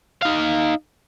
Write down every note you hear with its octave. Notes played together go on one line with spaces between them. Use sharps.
D#4 F5